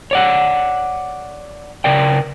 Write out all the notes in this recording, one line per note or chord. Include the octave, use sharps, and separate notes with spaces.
C#5 D5 F#5
C#3 A#4 D5 G5